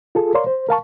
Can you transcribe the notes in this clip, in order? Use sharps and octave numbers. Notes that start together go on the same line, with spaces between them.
F4 G#4 A4
A#4 C#5 D5 F5 C6
C5
A#4 F5 A5 C#6